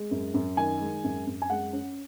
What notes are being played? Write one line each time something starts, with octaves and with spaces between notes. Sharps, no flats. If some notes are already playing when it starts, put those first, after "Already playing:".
Already playing: G#3
F#2
F#2
D#3 G#5
G#3
F#2
F#2
G#5
G#3 F#5
C#4